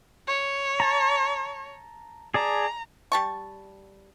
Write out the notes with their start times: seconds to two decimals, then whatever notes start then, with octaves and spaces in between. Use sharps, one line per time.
0.28 C#5
0.80 A5 A#5
2.34 G#4 D5 A5 A#5
3.12 G3 A5 C#6